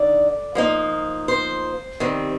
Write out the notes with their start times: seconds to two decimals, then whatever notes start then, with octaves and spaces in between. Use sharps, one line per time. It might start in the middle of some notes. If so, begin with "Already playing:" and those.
Already playing: D3 D#4 D5
0.55 F3 A#3 D#4
1.28 C5
2.00 C3 D#3 G3 C4